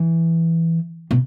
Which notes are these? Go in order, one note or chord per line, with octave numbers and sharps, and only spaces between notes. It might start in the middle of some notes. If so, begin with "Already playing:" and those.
Already playing: E3
B2